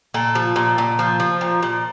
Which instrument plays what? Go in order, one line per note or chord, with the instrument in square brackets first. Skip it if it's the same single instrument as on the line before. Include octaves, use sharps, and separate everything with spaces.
[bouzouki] A#2 A4
F3
A#2
A#2
F3
F3
A#2
A#2